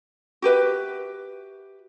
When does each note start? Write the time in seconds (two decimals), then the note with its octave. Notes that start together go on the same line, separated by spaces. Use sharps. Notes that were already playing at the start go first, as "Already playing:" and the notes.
0.42 F#4 G4 B4 E5